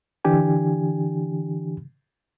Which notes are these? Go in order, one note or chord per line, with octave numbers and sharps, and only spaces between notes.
D3 E3 D4 G4 G#5